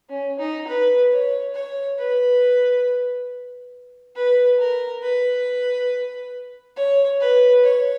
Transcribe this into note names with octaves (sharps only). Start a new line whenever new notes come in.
C#4
D#4
B4
C#5
C#5
B4
B4
A#4
B4
C#5
B4
C#5